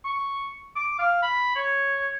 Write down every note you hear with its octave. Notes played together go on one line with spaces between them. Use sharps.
C#6
D6
F5
B5
C#5